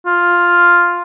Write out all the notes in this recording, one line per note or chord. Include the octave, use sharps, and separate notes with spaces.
F4